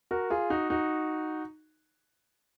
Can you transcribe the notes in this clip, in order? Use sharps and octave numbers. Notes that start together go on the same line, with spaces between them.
F#4 A#4
F4 G#4
D#4 F#4
D#4 F#4